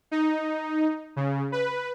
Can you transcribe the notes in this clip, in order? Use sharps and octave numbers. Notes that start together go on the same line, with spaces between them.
D#4
C#3
B4